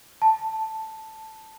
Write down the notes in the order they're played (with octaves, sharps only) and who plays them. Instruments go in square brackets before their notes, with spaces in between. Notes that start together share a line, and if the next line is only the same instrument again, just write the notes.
[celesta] A5